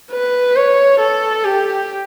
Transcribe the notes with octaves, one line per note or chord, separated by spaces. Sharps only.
B4
C#5
A4
G4